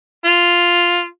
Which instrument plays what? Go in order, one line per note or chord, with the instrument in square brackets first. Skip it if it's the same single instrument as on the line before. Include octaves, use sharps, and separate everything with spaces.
[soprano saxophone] F4